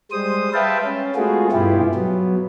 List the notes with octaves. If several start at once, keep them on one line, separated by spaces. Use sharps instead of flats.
G3 G#3 C5 D#6
B4 E5 F5 G5 A5
C#4
G#3 A3 B3 F4 F#4 G#4
G2 B2 B3 E4 F4 G4
F#3 B3